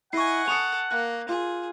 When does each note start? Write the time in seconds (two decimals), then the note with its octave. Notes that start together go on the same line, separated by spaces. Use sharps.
0.13 E4 D#5 F#5 G#5 C#6 C7
0.48 A4 C#6 D#6 C#7 F7
0.91 A#3 F#6
1.29 F4 G#4